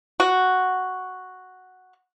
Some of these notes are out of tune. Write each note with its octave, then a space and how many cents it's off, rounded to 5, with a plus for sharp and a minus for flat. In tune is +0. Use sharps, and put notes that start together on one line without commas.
F#4 +0